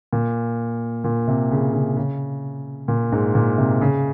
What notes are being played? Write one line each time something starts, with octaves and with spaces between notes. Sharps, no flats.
A#2
A#2
C3
C#3
C#3
C#3
A#2
G#2
A#2
C3
C#3